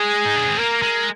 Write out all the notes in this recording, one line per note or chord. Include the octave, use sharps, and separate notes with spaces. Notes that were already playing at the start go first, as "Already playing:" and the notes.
Already playing: G#3 G#4
D#4
D4
C4
A#3 A#4
G#3